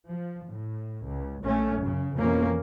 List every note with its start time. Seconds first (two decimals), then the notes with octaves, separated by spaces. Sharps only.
0.11 F3
0.51 A2
1.08 C#2
1.44 A#1 A3 C#4
1.79 F#2 C#3
2.15 F2 B2 E3 F3 A#3 C#4